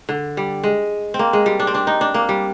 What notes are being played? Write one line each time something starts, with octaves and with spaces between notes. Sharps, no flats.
D3
G3
G#3
C4
A#3
G#3
G3
D4
C4
D4
D#4
D4
A#3
G3